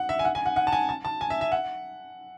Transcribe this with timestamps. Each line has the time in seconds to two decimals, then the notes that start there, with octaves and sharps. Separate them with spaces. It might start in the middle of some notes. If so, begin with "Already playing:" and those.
Already playing: F#5
0.09 E5
0.19 G#5
0.25 F#5
0.35 G#5
0.46 F#5
0.56 F#5
0.67 A5
0.72 G#5
0.89 A5
1.05 A5
1.21 G#5
1.30 E5
1.41 E5
1.52 F#5